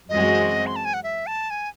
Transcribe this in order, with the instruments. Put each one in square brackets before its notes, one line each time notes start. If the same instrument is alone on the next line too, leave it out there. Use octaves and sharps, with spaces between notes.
[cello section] F#2 E3 G#3 C4 F#4 [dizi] D#5
[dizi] C6
A5
G#5
F#5
E5
A5
G#5